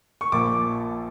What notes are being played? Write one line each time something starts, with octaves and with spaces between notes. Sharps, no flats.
C#6
A#1 A#2 F3 D6